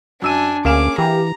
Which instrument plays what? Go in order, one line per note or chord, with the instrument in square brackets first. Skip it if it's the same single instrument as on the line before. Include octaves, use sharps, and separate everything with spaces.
[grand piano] F#2 E6 D#7 [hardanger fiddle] D4 G#5
[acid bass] D2 [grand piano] A#3 F5 E7 [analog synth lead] C#4 [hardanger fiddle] G#4 D6
[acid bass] E3 [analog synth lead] G4 [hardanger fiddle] A#5